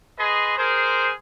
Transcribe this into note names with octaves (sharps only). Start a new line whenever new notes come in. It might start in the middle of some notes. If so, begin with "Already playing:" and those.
G#4 B4 D#5 C6
G#4 A#4 C5